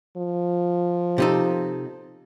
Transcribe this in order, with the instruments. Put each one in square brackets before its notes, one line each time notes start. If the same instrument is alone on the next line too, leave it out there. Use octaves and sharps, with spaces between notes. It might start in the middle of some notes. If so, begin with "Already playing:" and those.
[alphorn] F3
[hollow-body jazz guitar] C3 D#4 A4